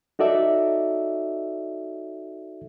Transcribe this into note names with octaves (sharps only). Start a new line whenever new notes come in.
D#4 F#4 A4 D5 E5